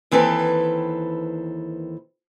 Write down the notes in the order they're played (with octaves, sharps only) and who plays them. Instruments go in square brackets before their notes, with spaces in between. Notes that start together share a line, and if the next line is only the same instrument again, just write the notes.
[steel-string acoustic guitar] D#2 E3 C4 A4 B4